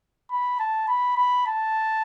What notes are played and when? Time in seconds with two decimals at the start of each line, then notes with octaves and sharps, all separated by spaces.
0.31 B5
0.60 A5
0.88 B5
1.17 B5
1.47 A5